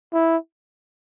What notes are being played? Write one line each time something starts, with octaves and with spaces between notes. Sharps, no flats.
E4